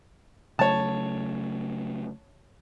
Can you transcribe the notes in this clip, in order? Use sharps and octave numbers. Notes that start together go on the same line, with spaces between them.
C#3 F#3 A3 C#5 A5